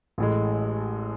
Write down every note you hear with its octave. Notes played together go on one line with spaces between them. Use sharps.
A1 A2 G#3